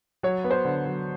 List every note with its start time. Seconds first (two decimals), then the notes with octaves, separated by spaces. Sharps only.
0.23 F#3 C#5
0.44 B3
0.51 C5
0.65 D3
0.85 F#3